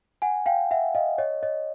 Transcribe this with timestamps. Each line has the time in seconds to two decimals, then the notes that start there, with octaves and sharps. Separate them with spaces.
0.22 F#5 G#5
0.46 F5 G5
0.71 E5 F#5
0.95 D#5 F5
1.18 C#5 D#5
1.43 C#5 D#5